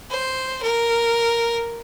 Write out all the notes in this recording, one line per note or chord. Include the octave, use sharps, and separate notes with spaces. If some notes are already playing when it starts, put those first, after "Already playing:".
C5
A#4